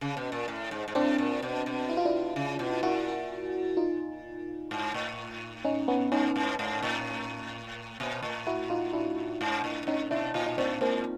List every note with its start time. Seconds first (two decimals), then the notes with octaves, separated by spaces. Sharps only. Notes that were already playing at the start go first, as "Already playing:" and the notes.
0.01 C#3
0.17 B2
0.32 A#2
0.48 A2
0.71 G#2
0.88 G#2
0.95 A2 C4 D4
1.18 A#2
1.42 B2
1.66 B2
1.90 E4
1.97 F4
2.05 D4 E4
2.36 C#3
2.59 B2
2.83 A#2 E4 F#4
3.77 D#4 F4
4.71 G#2
4.94 A2
5.65 C#4 D#4
5.88 B3 C#4
6.12 G#2 C#4 D#4
6.36 G#2
6.59 G#2
6.82 A2
8.00 A#2
8.22 A2
8.47 E4 F#4
8.70 D#4 F4
8.93 D4 E4
9.41 G#2
9.64 A2
9.87 A2 C#4 D#4
10.10 B2 D4 E4
10.34 A#2 D#4 F4
10.46 D#4
10.58 A2 C4 D4
10.81 G#2 A#3 C4